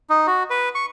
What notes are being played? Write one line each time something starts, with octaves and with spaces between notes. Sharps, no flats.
D#4
F#4
B4
C#6